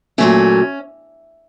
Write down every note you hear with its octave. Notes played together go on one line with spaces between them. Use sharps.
A#2 F#3 A3 C#4